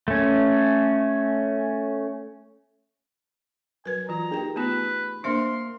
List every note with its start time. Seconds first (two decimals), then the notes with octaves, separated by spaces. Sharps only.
0.08 A3 C#4
3.86 F#3 A#4 B4 G#5
4.09 E3 F4 A#5
4.31 A#3 D#4 G4 G#4 A#4 G5
4.56 A3 B3 F4 B4
5.24 A#3 D4 C5 E5 C6 F6